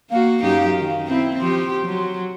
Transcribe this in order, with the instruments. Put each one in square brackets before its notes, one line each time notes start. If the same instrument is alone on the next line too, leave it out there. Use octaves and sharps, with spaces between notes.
[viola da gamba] A#3 F#4 [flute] F5
[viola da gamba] F#2 D#4 G4
D#3
[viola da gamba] C4 [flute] E4
[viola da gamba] F3 G4 [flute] C6
[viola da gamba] F#3